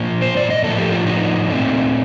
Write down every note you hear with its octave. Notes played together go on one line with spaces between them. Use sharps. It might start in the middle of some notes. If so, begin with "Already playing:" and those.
Already playing: A#2 F3 A#3
C5
D5
D#5
A2 F3 A#3 A4
G4
F4
D#4
A#2 A3 C4